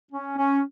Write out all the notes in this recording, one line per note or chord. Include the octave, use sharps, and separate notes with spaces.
C#4
C#4